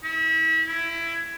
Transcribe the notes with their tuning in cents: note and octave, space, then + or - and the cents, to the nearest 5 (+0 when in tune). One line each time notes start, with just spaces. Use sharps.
E4 -35
E4 +20